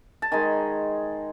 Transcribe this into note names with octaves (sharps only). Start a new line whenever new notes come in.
A5
D#3 G#3 G#5